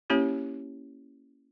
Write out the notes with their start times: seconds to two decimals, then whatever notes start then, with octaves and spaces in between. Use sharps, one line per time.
0.10 A#3 C#4 E4 G4 C#5